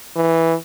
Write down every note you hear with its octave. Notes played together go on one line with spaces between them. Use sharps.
E3